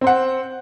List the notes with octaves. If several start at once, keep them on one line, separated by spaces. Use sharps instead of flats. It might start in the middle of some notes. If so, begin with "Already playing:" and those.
C4 C5 F#5